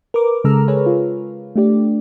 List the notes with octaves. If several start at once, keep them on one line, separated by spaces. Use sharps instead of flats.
A#4 B4 D6
C#3 G#3 A4 A#5 E6 F6
G#4 B4 C#5
F4
A3 D4 G4 D5